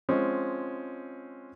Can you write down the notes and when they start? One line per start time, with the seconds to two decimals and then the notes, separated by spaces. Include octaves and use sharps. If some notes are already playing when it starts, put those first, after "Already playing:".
0.09 F3 G#3 C4 C#4